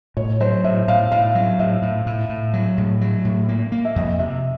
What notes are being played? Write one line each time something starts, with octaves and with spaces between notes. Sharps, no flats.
A2 C#5
F#3 C5
A2 E5
A2 F5
A2 F5
F#3
A2 E5
A2
A2
A2
F#3
A2
F#3
A2
A#3
A#3
E5
F2 D#5
C3 E5